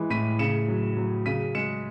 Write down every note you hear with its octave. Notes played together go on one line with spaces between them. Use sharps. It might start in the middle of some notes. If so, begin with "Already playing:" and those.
Already playing: E3 G#3
A2 B6 D#7
C#3 C#7 E7
F#3
F#3
C#3 B6 D#7
G#3 C#7 E7